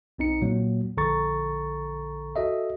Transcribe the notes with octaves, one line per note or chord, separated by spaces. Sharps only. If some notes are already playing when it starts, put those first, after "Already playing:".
B1 C4 D#4 C#7
A#2 F#3 A#3
A#1 D3 A4 A#5 C#6 A6
F#4 A4 D#5 E5